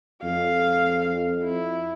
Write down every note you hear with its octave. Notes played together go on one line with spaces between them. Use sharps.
F2 F5
E4